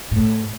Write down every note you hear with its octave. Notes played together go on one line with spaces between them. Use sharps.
A2